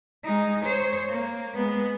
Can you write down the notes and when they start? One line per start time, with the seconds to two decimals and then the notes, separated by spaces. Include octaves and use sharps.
0.24 G#3 D#4
0.65 C5 C#5
1.10 A#3
1.54 G#3 B3